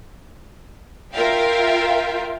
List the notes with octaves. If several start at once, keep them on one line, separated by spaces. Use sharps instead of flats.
F4 A#4 E5 F5 G5